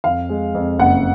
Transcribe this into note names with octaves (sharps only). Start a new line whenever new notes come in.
F2 F5
G#3
F2
F#1 F#5